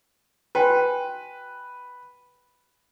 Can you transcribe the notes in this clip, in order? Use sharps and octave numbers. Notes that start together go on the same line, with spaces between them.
F#4 B4 G5 G#5